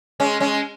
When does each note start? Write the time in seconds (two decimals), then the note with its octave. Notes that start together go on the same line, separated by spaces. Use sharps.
0.20 G#3 C#4
0.40 G#3 C#4